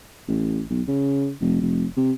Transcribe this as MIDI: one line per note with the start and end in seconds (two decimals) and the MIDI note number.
0.28 0.63 33
0.70 0.82 35
0.88 1.31 49
1.41 1.57 29
1.61 1.86 29
1.97 2.12 48